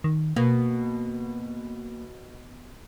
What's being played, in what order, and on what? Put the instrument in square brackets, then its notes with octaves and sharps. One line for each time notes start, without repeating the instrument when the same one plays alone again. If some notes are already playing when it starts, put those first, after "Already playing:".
[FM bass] D#3
[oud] B2 [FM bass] A#3